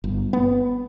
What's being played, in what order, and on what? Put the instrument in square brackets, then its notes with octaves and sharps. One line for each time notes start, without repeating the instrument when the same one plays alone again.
[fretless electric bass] G1
B3